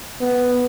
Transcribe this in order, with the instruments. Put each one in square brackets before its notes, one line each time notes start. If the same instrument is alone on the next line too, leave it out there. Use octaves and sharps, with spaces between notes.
[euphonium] B3